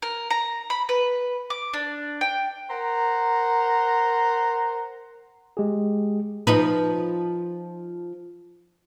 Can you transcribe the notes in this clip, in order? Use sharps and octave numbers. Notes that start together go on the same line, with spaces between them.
A#4
A#5
B5
B4
D6
D4
G5
A#4 C5 F#5 A#5
G#3 G4 G#4
F3 D#4 B4